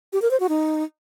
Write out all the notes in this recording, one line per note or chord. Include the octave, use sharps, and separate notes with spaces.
G4
A#4
C5
F#4
D#4